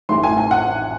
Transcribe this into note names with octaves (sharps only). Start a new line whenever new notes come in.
A1 A2 E3 C6
G#5
G#5
F#5